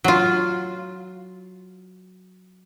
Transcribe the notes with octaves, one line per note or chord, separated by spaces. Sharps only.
F#3 F4